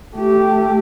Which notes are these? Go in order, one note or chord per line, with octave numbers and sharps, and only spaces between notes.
A3 G4